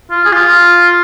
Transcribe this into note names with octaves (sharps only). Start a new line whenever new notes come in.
F4
G#4
F4